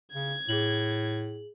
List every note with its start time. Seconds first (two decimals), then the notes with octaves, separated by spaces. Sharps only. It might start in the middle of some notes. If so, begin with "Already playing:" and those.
0.14 C#3 G#6
0.49 A2 G#4 F#7